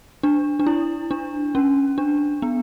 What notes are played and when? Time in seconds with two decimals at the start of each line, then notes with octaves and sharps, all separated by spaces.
0.23 D4
0.60 D4
0.66 E4
1.11 D4
1.55 C#4
1.98 D4
2.42 B3